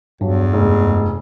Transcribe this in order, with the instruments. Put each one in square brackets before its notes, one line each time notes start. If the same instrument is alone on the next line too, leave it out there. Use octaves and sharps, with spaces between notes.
[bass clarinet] E2 [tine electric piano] G2 [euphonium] F#3
[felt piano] F1 [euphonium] G#3